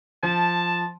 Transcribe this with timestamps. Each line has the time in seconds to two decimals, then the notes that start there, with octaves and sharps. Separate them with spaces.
0.23 F3 A5